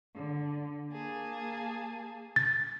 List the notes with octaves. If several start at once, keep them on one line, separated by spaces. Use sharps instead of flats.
D3
A#3 G#4 A5
A6